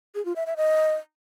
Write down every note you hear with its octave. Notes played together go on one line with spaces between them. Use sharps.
G#4
F4
E5
E5
D#5